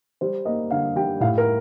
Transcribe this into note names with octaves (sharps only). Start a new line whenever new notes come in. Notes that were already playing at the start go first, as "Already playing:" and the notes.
G3 C5
A#3 D#5
D3 F5
G3 G5
A2 F5
A#4